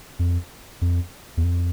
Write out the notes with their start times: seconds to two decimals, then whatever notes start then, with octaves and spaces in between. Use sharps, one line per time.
0.19 F2
0.81 F2
1.37 E2
1.44 F2